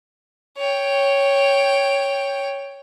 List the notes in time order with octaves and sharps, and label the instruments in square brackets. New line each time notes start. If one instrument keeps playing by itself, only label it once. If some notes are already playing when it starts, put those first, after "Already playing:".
[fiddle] C#5 G5